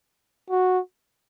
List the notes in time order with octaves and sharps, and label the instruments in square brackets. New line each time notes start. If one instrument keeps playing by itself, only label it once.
[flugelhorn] F#4